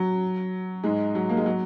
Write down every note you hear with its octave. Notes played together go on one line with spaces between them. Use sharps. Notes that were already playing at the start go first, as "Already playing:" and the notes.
Already playing: F#3
G#2 G#3
F#3
A#3
G#3
F#3